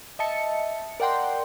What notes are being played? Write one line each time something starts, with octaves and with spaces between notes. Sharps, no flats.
D#5 E5 A5 C#7
A#4 D5 F#5 G5 C6